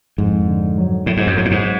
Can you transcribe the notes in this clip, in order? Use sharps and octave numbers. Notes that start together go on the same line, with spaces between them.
F2 G#2
D3
F#3
A2 F#3
G#2
F#2
G#2 F#3
A2
G#2